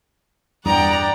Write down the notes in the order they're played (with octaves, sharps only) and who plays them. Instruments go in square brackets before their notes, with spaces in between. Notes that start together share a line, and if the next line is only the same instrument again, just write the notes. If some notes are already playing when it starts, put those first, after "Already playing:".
[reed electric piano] E2 G2 D#6 [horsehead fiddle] D5 [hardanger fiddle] F#5 G5 [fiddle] A#5